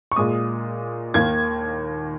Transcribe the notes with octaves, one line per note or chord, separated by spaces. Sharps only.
C#6
A#2 G#3 D#6
D#2 D#3 A#3 G#6